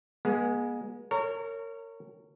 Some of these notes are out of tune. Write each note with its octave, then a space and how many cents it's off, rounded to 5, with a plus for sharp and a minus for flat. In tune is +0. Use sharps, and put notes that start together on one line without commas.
G#3 +0 B3 -45
A#4 -30 C#5 +5